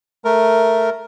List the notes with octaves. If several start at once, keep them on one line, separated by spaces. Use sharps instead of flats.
A3 A#4